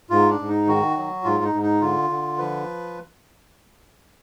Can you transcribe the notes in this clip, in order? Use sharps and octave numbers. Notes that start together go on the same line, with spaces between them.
G#2 F4
D4
G#2
D#4
D#3 F#4
F#3
G#2 F4
D#4
G#2
D#4
D3 F4
D3
F3 B4